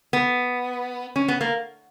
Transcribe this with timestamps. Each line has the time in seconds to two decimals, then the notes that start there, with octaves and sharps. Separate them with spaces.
0.13 B3
1.16 C#4
1.28 B3
1.41 A#3